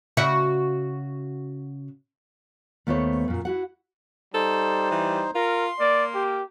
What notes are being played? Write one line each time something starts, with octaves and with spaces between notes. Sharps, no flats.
C#3 F#4 E5
D#2 A3 B3 C5 C#5
F#2 A#2
E4 F#4 F#5
G3 D#4 A4 C5
E3
F4 A#4 C6
A#3 D5
G4